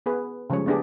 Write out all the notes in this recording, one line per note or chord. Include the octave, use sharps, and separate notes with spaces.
B3 G#4 B4
C#3 F3 G3 G#3 C#5
A3 B3 D4 G4 G#4